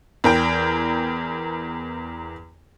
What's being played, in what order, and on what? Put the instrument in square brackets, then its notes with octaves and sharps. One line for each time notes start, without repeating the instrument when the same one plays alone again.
[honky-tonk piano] E2 A#4 G5